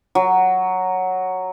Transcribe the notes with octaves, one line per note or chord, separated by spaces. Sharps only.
F#3